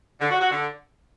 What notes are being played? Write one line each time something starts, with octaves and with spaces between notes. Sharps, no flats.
D3
F#4
F#4
D3